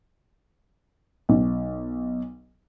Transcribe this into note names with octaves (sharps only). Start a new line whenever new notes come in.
B1